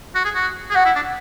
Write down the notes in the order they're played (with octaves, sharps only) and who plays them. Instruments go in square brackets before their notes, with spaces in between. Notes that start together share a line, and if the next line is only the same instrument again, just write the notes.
[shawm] F#4
G#4
F#4
G#4
[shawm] F#4 [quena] F#5
[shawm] E4
D4